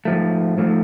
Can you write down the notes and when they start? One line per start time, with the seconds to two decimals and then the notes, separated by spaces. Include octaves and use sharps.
0.05 G#2 F3 A3
0.58 G#2 F3 A3